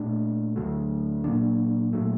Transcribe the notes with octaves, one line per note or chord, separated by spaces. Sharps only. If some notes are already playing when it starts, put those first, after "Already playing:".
Already playing: A#2 A3 D4
D2 D3 F#3 A3
A#2 F#3 A#3 D4
A#2 F#3 A3